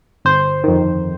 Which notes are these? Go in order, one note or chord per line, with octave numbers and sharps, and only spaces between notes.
G1 C5
F2 D#3